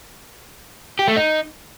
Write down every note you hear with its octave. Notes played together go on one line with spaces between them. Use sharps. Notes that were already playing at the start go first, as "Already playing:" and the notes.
G4
A3
D#4